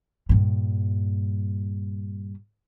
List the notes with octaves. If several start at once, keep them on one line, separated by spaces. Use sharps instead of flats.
G2 A#2